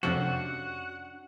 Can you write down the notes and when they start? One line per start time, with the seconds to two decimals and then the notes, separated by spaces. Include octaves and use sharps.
0.03 F2 C3 F3 C#4 D4 F#4 F#5